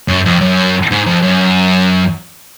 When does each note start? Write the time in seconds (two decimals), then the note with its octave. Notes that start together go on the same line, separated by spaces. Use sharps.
0.08 F#2
0.26 F2
0.41 F#2
0.91 G#2
1.06 F2
1.22 F#2